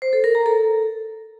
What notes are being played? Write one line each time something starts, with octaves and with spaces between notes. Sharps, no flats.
C5
A4
A#4
A#5
A4